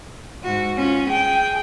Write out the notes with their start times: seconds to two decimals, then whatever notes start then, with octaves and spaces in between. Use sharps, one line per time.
0.43 G#2 F#4
0.77 C#4 F4
1.08 G#4 G5